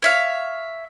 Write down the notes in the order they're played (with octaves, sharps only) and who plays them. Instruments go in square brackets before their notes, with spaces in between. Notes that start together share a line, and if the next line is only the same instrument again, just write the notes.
[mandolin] C#5 E5 F5